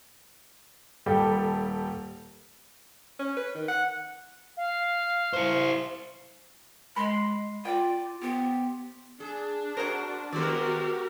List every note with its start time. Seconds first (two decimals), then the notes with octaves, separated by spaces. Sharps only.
1.06 D#1 G3 G4 A4
3.19 C#4
3.37 B4
3.55 D#3
3.68 F#5
4.57 F5
5.33 E4 C5
6.96 G#3 B5 C6
7.65 F4 D5 D#5 G5
8.22 B3 G4 C5
9.20 D4 G#4
9.77 F#4 G#4 A#4 C5 F#5
10.32 D#3 G#3 B3 F#4 G4 A#4 C5 D5